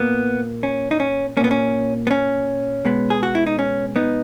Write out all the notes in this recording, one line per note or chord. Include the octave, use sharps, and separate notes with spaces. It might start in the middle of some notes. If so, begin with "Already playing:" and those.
Already playing: A#2 A#3 B3
C#4
D#4
C#4
A#2 A#3 B3 C#4
C#4
B3
C#4
B2 G#3 B3
G#4
F#4
E4
D#4
C#4
B3 D#4